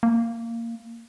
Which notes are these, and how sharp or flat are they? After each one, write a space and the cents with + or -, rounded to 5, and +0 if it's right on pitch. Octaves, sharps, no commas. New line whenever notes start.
A#3 -15